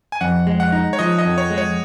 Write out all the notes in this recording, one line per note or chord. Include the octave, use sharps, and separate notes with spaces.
G#5
F2 F#5
G#3
F#5
D#4
C#5
F3 D#5
D#5
F2
C#5
G#3
C#5